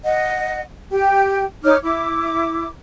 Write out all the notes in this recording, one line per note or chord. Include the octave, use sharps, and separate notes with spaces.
D#5 F#5
G4 G5
D#4 C#5 D6 F6
E4 D6